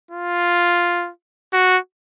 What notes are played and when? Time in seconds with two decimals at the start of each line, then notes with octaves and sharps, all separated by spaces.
0.11 F4
1.53 F#4